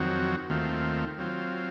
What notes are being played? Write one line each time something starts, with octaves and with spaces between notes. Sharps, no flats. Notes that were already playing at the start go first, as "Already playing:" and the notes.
Already playing: F2 D#3 F#3 C4 F#4
D#2 D#3 A3 C4 F4
F#3 C4 F4